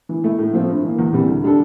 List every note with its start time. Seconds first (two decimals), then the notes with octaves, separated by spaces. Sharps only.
0.09 E3
0.24 A3 E4
0.38 A2
0.53 F3 A3 C4
0.69 G2
0.83 E3 A#3
0.99 E2
1.13 C3 E3 G3
1.28 D2
1.43 D3 G3 D4 A4